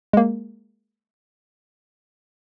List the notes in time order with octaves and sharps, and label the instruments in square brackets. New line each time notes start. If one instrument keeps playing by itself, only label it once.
[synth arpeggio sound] G#3 A#3